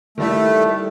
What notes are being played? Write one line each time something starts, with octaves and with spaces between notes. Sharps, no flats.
D#3 G3 A3 E4